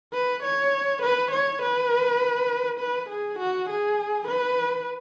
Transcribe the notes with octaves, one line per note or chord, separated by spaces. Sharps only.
B4
C#5
B4
C#5
B4
B4
G#4
F#4
G#4
B4